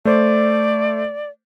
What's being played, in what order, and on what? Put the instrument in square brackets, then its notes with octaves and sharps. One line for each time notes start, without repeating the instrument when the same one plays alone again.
[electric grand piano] A3 C5 [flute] D5